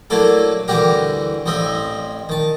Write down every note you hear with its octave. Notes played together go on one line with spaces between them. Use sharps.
F#3 A3 A#3 D4 E4 A4
D2 E3 G3 F#4 G4 A#4
A1 G3 C4 D#5 E5
D#3 A5